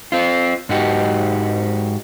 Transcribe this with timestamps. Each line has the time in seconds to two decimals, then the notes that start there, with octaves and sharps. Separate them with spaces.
0.12 C4 F4
0.69 G#2 D#4 F#4 G4